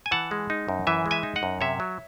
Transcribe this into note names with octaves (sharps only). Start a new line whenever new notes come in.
G#5
E3 F#5 A5
G#3
D#4
F#2
E3 E5 G#5
G#3
E5 G#5
D#4
D#5 F#5
F#2
C3 C#5 E5
F#3